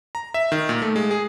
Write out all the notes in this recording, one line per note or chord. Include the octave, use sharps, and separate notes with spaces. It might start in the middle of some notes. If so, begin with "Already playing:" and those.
A#5
E5
D#3
A#2
A3
G#3
G#4